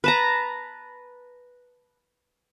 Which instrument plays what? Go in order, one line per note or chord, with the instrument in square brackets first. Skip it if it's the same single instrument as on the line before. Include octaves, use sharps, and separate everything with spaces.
[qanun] B4 A5 A#5